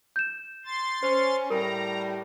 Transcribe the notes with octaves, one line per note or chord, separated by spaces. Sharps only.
G6 E7
C6 A6
C#4 C5
A2 G3 A#4 A#5